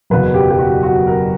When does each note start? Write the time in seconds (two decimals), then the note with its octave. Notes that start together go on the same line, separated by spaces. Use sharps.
0.10 F#1 E2 B2 F#3 B4
0.34 G4
0.51 G4
0.59 F#4
0.83 F#4
1.07 A#4